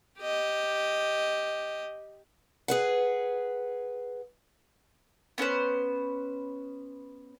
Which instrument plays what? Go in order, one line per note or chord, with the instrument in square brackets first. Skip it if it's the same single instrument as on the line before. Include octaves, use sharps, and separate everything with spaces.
[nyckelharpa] G4 D#5
[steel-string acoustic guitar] G#4 B4 F#5
[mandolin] B3 C#4 B4 C5